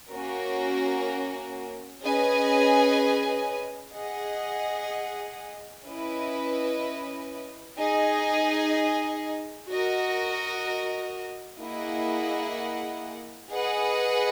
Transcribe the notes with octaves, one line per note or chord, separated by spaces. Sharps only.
A#3 C#4 F#4 A#4
C#4 G#4 B4 D#5 G#5
G#4 D#5 F#5
C#4 E4 B4 D#5
D#4 G#4 D#5 G#5
F#4 A#4 D#5
A#3 E4 G#4 D#5 F#5
G#4 B4 D#5 F#5